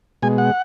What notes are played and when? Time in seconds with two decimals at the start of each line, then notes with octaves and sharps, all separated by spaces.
0.22 B2 G#3 G#5
0.38 F#5